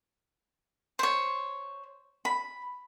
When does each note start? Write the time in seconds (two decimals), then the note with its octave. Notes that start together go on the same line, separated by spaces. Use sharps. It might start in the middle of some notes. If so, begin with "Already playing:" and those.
0.99 C5 C#5
2.25 B5